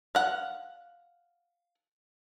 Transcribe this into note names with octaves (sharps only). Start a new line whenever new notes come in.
F5 F#5